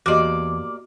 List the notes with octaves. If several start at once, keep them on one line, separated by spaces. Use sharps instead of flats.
E2 A#3 F#4 G4 D5 D#5 D6